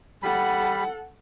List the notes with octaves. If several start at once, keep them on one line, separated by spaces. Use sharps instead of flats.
G3 A4 F#5 B5